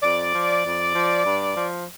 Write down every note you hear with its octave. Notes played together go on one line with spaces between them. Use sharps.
F2 D5
F3
F2
F3
G2
F3